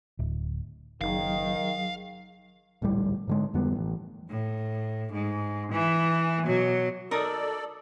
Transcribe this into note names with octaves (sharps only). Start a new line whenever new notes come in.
D1
F#1 D#3 F#3 G#4 F5
D1 A#1 A2 G3
G#2 D3 G#3
F2 D3 G3 B3
A1
A2
G#2
E3
B2 F#3
D#4 A4 A#4 D5 D#6